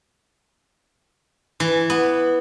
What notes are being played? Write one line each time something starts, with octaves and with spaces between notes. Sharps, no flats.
E3
B3